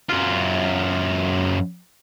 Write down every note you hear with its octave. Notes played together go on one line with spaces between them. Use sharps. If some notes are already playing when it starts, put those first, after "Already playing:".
F#2 F4